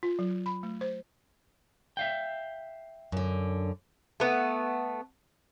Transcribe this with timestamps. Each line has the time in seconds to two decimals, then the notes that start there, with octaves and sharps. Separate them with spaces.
0.03 F4
0.19 F#3
0.46 B5
0.63 A3
0.81 C5
1.97 E5 F5 G5
3.12 F#2 D3
4.20 A3 B3